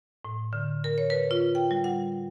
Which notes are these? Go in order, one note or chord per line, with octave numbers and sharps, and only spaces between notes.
A2
D3
A#4
C#5
B4
F4
G5
G3
F#5